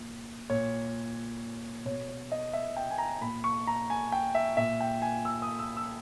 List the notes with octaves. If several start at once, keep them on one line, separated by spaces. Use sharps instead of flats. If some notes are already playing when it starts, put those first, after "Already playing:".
Already playing: A#2
A#2 C#5
B2 C#5
C#5
D#5
E5
G5
G#5
A#5
A#2 B5
C#6
A#5
G#5
G5
E5
A#2 E5
G5
G#5
E6
D#6
E6
E6